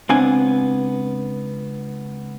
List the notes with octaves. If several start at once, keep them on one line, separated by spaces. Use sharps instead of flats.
C#2 B3 C4 D4 G#5